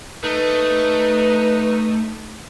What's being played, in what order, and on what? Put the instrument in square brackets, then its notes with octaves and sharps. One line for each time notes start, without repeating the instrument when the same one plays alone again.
[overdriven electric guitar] A3 [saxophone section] D#4 [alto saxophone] B4